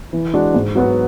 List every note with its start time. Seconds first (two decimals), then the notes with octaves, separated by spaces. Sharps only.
0.13 E3
0.34 G#3 D4 F#4
0.54 G#2
0.75 F#3 B3 F#4